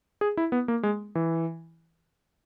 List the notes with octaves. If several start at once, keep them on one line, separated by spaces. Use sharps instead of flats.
G#4
E4
B3
A#3
G#3
E3